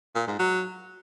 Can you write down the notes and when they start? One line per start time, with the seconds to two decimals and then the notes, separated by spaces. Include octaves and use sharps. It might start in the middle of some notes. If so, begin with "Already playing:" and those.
0.15 A#2
0.27 G#2
0.39 F#3